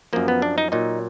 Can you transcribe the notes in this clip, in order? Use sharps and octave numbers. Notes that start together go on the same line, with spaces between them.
F#2 F3 A#3
B3
D4
D#4
A#2 F#3 D#4